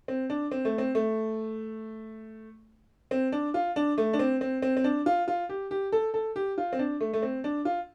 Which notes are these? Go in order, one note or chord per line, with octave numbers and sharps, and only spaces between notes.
C4
D4
C4
A3
C4
A3
C4
D4
F4
D4
A3
D4
C4
C4
C4
C4
D4
F4
F4
G4
G4
A4
A4
G4
F4
C4
D4
A3
A3
C4
D4
F4